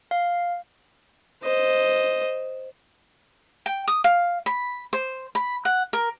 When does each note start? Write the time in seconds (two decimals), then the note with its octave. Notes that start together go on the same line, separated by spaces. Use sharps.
0.11 F5
1.43 C5 D#5
3.66 G5
3.88 D#6
4.04 F5
4.46 B5
4.93 C5
5.35 B5
5.65 F#5
5.93 A#4